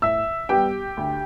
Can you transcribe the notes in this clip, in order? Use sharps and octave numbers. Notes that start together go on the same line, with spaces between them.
A2 E5 E6
G3 B3 G4 G5
D2